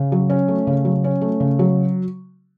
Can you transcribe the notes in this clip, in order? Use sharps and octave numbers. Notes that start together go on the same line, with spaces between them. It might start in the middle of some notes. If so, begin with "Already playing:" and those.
Already playing: C#3
F#3
C#4
A3
C#3
F#3
C#4
A3
C#3
F#3